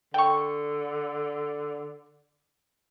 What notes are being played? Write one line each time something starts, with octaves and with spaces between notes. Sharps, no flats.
D3 G5 C#6